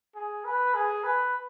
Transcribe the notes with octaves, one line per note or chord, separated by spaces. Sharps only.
G#4
B4
G#4
B4